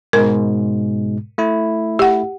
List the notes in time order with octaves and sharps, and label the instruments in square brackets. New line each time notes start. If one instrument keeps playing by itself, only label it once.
[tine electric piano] G#2 B2 G#3 [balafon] A#4
[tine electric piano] A3 E4
[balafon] G4 F#5